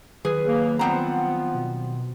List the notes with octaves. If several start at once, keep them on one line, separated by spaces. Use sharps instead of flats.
D#3 F#3 G#4 B4
C#3 A#3
F3 G3 B3 C4 F#5 A#5
B2